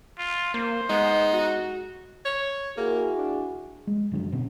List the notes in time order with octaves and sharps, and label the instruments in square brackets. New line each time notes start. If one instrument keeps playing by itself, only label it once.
[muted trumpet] F4
[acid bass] A#3 [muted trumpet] C5
[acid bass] G#3 [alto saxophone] B3 [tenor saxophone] D#4
[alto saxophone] F#4
[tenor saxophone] C#5
[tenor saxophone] A#3 [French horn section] E4 F#4 G#4
[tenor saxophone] D4
[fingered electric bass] G#3
F#2 D3 F#3
B2 D3 C#4